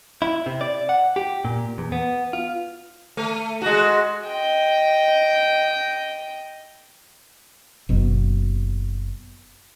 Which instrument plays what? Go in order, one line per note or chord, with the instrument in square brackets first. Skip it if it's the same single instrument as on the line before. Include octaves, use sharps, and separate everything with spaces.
[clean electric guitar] E4
C3
D5
F#5
G4
A#2
E2
B3
F4
[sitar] A3
G#3 F#4
[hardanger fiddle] D#5 G5
[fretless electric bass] F#1 B2